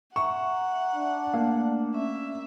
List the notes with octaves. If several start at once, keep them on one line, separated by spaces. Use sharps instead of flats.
E5 F#5 A#5 C#6
D4
A3 A#3
C#4 E5